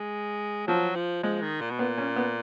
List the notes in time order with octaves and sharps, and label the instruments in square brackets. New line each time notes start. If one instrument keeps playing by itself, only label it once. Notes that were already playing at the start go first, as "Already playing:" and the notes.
Already playing: [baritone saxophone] G#3
[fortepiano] F3 [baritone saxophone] F#3
[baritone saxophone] F3
[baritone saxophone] F3 [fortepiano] G#3
[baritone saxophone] D#3
A#2
B2
[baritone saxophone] A#2 [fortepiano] B3
[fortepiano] C#4
B3